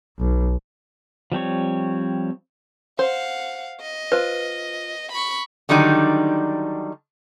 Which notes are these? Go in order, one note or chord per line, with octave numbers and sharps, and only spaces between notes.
B1
F3 G3 C4 C#5
C5 F5 F#5
D#5
F4 B4 C5
B5 C#6
D3 D#3 F#3 G3 D4 D#4